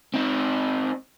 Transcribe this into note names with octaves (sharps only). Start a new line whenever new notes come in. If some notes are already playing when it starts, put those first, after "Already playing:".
C4 D#4